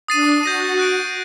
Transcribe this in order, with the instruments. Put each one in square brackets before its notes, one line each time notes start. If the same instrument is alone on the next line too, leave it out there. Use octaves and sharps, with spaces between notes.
[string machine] D4 [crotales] D#6 A6 C7 D#7
[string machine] F#4 [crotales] G6 A#6 D#7
[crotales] D#6 F#6 A6 D7